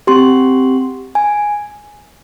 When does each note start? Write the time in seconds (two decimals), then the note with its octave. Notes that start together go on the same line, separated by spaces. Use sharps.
0.07 C4 G4 C6
1.15 G#5